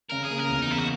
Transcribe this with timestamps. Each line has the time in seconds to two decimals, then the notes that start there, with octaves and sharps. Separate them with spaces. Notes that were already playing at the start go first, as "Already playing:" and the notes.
0.11 C#3 A#4
0.25 G#4
0.30 A#3
0.39 A#4
0.49 E2
0.62 D#4
0.68 A#3 E4
0.78 F#4